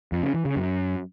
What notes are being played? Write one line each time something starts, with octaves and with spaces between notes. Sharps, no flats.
F2
C#3
E3
C#3
F#2